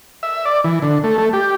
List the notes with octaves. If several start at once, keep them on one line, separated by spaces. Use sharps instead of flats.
E5
D5
E3
D3
A3
A3
G4